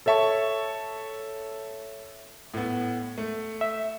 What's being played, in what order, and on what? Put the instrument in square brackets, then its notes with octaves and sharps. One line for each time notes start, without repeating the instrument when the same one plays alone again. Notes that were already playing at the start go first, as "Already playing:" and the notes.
[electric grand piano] A4 C#5 E5 A5 C#6
[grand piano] A2 B3
A3
[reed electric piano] E5